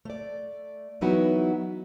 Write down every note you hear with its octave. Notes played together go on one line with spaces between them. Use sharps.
A3 D5
E3 F#3 B3 D#4 E4 F#4